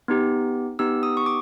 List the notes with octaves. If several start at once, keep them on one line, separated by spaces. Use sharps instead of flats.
B3 D#4 G4
B3 D#4 G4 E6
D#6
C#6
D6